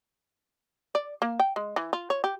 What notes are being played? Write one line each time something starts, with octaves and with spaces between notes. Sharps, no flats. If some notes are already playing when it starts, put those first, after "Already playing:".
D5
A#3
G5
G#3
E3
F4
C#5
G4